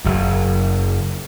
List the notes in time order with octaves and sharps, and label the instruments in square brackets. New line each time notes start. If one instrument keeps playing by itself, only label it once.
[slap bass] F#1 F#2